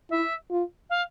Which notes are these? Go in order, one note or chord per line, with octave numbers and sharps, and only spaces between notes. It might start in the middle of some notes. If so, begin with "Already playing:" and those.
E4 E5
F4
F5